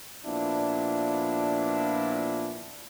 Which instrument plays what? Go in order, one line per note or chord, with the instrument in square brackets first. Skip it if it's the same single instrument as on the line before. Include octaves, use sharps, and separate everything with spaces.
[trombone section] A#2 F3 B3 D4 E4